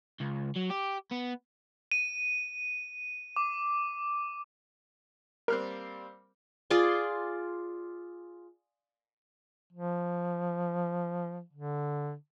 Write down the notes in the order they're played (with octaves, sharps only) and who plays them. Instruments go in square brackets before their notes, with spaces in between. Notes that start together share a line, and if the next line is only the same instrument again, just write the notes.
[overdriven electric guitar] C#2
F#3
G4
B3
[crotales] D#7
D6
[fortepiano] G3 A#3 C4 [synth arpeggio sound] A#4 F6 F#6
[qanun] F4 G#4 D5 C6
[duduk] F3
D3